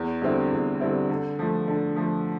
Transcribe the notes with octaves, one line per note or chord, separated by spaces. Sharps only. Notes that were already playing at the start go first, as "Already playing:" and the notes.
Already playing: E2
D3 G3 C4 E4
E2
D3 G3 C4 E4
D3
F3 A3
D3
F3 A3